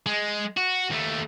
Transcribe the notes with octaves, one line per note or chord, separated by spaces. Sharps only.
G#3
F#4
D#2 A3